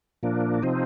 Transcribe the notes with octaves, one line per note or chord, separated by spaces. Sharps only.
A#2 F3 A#3 D4
C3 F3 C4 D#4